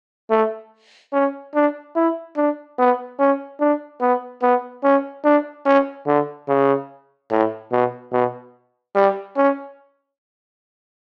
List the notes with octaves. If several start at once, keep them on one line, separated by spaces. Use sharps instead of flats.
A3
C#4
D4
E4
D4
B3
C#4
D4
B3
B3
C#4
D4
C#4
D3
C#3
A2
B2
B2
G3
C#4